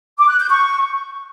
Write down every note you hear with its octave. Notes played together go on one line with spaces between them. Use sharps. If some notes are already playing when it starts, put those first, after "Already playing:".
D6
F#6
G6
C#6